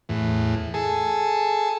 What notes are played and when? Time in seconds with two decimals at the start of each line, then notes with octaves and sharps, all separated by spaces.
0.09 E2 A2
0.74 G#4 A4